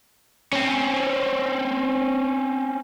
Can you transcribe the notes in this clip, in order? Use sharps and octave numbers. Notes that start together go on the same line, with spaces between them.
C4 C#4